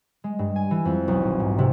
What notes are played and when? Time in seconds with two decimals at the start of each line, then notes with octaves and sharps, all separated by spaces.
0.24 G#3
0.39 G2
0.56 G#5
0.71 E3
0.85 F2
1.08 B1
1.23 D#1
1.40 G#2
1.58 C3